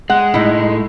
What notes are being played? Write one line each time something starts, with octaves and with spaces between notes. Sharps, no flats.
G#3 F#5
A2 D#4 E4